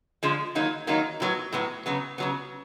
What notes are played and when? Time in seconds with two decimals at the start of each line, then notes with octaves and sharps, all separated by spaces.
0.23 D3 F3 G#3
0.55 D#3 F#3 A#3 D#4
0.87 D#3 F#3 A#3 D#4
1.20 A2 F#3 B3
1.53 A2 F#3 B3
1.86 C#3 F#3 B3
2.18 C#3 F#3 B3